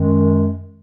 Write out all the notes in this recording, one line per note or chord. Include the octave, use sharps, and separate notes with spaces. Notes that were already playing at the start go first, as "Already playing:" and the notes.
Already playing: F#2 D#3 G#3